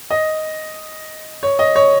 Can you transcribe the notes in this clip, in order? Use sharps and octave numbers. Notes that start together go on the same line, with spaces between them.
D#5
C#5
D#5
C#5